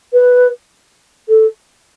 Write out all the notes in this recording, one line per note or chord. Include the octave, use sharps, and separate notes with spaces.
B4
A4